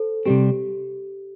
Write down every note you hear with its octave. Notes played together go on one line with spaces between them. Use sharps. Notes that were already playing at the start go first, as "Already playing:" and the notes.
Already playing: A4 C5
C3 G3 C4 G4